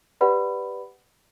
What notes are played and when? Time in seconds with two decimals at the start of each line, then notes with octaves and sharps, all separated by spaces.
0.21 G4 B4 D5 F#5 B5